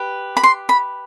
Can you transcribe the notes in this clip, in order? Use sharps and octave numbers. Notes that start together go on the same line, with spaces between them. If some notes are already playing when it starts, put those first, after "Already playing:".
Already playing: G4 B4
B5
C6
B5